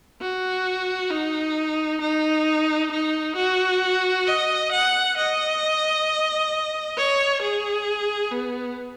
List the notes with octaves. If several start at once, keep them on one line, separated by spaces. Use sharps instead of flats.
F#4
D#4
D#4
D#4
F#4
D#5
F#5
D#5
C#5
G#4
B3